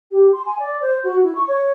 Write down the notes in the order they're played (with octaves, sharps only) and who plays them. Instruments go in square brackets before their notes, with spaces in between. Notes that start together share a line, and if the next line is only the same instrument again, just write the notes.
[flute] G4
C6
G#5
D5
C5
F#4
E4
C#6
C#5